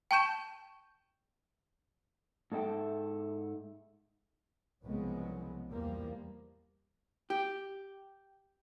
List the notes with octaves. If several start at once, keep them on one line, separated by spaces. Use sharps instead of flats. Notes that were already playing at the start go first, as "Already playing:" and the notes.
G5 A5 C#6 G6 E7
G#2 A4 E5 G5
C2 C#3 F3 F#3 G#3 B3
E2 E3 F3 G3 A#3
G4